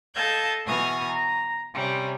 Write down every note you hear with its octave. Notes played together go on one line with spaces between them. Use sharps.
A4 D#5 F5 A5 G6 G#6
B2 E3 G#5 C#6 D#6 F6
A#5
C3 G3 C#4